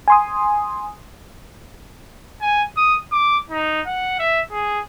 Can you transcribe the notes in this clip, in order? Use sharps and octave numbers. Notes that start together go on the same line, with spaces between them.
G#5 C6 D#6
G#5
D#6
D6
D#4
F#5
E5
G#4